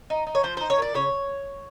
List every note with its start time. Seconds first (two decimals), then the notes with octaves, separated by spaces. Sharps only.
0.10 D#4
0.27 D#4
0.35 C#5
0.43 F3 C5
0.57 D#4 C5
0.70 C#5
0.78 A#2 D5
0.94 C#3 C#5